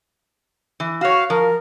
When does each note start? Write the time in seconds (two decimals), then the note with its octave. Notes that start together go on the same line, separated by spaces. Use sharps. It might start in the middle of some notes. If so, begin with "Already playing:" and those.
0.80 E3
1.01 F#4 C#5 F5
1.30 F3 A#4